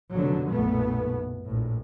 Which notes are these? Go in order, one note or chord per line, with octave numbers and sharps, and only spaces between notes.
F1 B2 D3 F#3
F#1 B1 A#2 A3 B3
A#1 A2